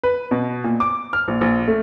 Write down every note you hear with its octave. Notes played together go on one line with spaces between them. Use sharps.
B4
B2
A#2
D6
F6
A#1
A#1
A3